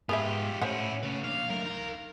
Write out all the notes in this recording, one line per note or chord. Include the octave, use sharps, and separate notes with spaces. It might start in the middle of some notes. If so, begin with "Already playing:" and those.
G#2 G#3 B3 F4 G4 G#4 E5
A2 C#4 E4 C5 E5 F#5
C#3 A3 B4
A#3 D4 F5
F#3 A3 A#4
D#4 F5